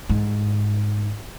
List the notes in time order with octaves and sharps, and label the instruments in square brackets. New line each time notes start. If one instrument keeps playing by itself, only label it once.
[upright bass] G#2